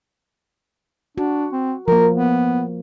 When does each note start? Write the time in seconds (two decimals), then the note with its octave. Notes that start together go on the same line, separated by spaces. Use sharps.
1.18 D4 F#4
1.52 C4
1.88 F3 A#3 A#4
2.15 B3